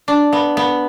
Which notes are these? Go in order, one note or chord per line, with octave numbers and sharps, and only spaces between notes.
D4
B3
B3